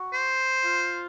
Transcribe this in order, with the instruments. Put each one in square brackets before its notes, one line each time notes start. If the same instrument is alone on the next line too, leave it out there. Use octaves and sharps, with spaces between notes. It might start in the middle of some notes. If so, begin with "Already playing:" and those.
Already playing: [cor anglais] F#4
[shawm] C5
[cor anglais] F4